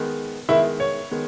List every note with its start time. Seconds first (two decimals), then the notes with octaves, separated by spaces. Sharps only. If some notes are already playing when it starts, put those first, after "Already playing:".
Already playing: D#3 G#3 B3
0.49 D#3 G#3 B3 E4 E5
0.80 C#5
1.11 D#3 G#3 B3